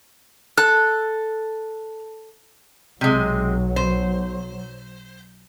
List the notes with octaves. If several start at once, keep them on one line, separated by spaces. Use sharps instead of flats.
A4 F#6
B1 C3 F#3 G#3
C5